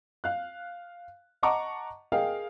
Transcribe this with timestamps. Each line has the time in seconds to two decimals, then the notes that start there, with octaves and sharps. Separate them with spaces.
0.24 F5 F#6
1.43 D#5 F#5 A5 A#5 C#6 D6
2.12 G#4 A#4 D#5 F5 G5